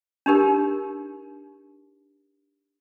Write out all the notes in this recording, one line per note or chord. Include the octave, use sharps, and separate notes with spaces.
D4 D#4 G4 A#4